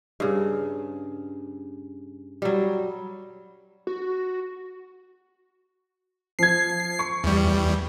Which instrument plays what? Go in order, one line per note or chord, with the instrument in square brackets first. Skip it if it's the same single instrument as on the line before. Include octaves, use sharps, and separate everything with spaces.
[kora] G2 C#3
F#3 G3
[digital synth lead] F#4
[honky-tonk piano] F3 G#6 [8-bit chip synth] C7
[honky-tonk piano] C#6
[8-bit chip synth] E2 G3